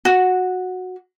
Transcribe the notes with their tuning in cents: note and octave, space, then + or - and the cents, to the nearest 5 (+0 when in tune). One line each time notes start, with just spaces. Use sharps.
F#4 -10